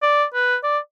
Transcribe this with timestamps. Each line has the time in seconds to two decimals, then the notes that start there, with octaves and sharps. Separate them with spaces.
0.03 D5
0.34 B4
0.64 D5